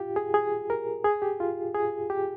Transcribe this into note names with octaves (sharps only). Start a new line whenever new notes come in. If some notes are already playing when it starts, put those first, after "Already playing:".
Already playing: F4 G4
G#4
G#4
A#4
G#4
G4
F4
G#4
G4